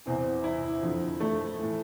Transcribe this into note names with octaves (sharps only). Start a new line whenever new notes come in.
E2 C3 E3 C4
E4
F2 D3 F3
A3
A2 E3